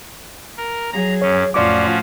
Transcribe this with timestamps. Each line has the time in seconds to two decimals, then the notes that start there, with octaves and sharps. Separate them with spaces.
0.57 A#4
0.93 F#3 G#4 A#5
1.22 F#2 C#4 C#5
1.54 F2 A2 F3 C#4 F4 F#4 D5 D6